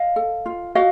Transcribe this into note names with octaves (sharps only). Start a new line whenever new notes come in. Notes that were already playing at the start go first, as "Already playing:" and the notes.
Already playing: D#5 F5
A4
F4
F#4 D#5 F5